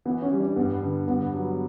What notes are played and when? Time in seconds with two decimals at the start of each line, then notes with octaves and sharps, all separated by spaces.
0.05 E3 B3
0.22 C#4
0.31 G3
0.40 D4
0.56 G2 B3
0.82 D3
1.07 G2 B3
1.34 F#3